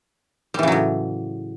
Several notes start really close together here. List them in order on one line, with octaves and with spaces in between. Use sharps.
G3 E3 C#3 F#3 A2